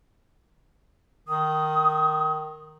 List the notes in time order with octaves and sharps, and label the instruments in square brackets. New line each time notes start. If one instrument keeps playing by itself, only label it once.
[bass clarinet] D#3 [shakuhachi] D#6